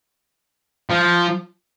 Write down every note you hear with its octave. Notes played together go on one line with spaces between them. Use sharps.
F3